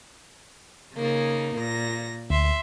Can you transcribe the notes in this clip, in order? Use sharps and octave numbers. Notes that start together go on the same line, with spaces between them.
C#3 A#3 D#4
A#2 A#6
D2 E5 C6